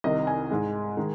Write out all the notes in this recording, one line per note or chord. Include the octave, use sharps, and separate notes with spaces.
C2 C3 D#3 D#5
G#5
G#2 G#3
D#3 G#3